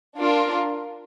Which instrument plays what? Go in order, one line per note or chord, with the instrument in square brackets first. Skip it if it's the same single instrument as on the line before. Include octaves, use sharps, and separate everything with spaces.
[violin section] D4 F4 A#4